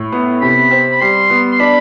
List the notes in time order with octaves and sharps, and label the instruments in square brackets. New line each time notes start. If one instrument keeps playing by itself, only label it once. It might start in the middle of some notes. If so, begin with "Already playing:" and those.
Already playing: [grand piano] A2
B3
[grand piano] C3 [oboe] B5
[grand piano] C4
[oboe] B5
[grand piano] G3 [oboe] C6
[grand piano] B3
[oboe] C6
[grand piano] D4 [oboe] B5